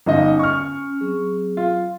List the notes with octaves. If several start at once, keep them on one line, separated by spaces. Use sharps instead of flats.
G1 C#4 D#4 D#5 G#5
C#6 F6
F#3 C4 G#4
F4